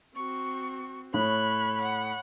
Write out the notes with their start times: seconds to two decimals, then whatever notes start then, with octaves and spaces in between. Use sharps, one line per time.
0.16 C4 F#4 C#6
1.14 A2 C#5 B5 F#6
1.82 F#5